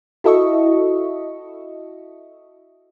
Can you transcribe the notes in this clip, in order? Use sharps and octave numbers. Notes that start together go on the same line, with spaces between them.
E4 F#4 A4 D#5 E5 C#6